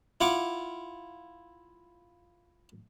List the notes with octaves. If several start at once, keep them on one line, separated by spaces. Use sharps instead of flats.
E4 F4 F#5 D6